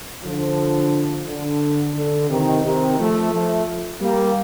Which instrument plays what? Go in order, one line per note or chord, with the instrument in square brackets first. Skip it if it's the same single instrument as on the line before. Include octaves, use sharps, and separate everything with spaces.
[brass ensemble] D3 F3
D3
D3
C3 D#3
C3 D#3
F3 A3
F3 A3
G3 A#3